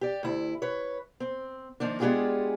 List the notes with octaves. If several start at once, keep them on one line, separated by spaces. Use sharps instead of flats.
G4 D5
D2 E4
B4 C#5
C4
D#3 F3 A#3 D4
G#3 B3 D4 F4 G4 G#4